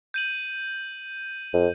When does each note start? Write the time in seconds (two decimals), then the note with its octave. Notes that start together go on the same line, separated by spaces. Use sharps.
0.14 G6 D#7 F#7
1.53 F2